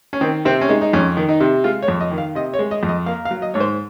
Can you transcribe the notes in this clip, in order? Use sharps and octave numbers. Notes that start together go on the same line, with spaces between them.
C#4
D#3 C4
C3 C4
C#4
G#3 D#4
D#4
F2 C#4
D#3
D#4
C3
G#3 F4
C#5
F2
D#5
D#3
F5
C3 D#5
C#5
G#3
D#5
F2
D#5
A#3 F5
F5
F#3
D#5
G#2 C#5
C5